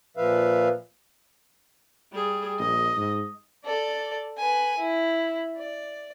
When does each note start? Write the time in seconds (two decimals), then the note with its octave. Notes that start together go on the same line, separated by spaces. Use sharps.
0.17 A#2 F3 B4 E5 F5
2.12 G3 G#4
2.59 A#1 D#5
2.97 G#2
3.64 A4 D5
4.37 B4 G#5
4.78 E4
5.57 D5